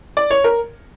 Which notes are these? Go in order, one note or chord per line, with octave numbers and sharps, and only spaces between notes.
D5
C#5
A#4